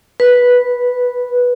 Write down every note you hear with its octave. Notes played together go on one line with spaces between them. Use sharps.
B4